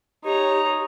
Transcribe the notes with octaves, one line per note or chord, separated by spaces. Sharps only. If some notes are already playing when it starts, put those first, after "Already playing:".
D#4 G4 C#5 A#5